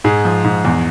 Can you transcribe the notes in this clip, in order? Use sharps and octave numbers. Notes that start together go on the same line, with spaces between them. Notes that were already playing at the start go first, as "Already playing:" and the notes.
G#2 G#4
F3
G#2
E2